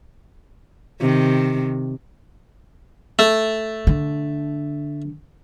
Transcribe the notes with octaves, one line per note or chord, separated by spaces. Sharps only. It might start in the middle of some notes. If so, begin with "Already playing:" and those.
C3 D#3
A3
D3